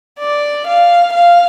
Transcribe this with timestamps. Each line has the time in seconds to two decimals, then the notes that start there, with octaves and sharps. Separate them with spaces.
0.20 D5
0.67 F5
1.13 F5